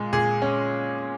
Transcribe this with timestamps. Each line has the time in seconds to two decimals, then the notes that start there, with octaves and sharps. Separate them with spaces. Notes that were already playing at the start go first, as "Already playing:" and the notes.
Already playing: A#2 G#3
0.13 A#2 G#4
0.42 C#4